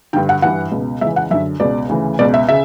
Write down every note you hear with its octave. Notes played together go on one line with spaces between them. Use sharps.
G2 D3 G5
F#5
G2 E3 F#5
C#2 B2
C#2 C#3 E3 E5
F#5
F#2 D3 E5
C#2 B2 D5
D2 C#3 E3
C#2 B2 D5
E5
C#3 E5